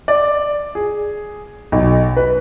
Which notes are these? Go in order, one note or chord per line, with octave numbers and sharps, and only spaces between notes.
D5
G#4
B1
B4